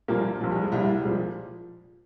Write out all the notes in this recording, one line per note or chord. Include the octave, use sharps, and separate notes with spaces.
A#1 A#2 F3 G3 A#3
A#1 A#2 F3
G3
G#3
C2 A#2 F3 G3
G3
A#2 F3 G#3